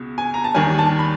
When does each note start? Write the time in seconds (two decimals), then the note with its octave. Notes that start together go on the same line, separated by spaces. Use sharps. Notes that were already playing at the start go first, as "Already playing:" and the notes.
Already playing: C#2 B2
0.18 G#5
0.34 A#5
0.44 A5
0.55 D#2 D#3 G3 G#5
0.79 A5
0.99 B5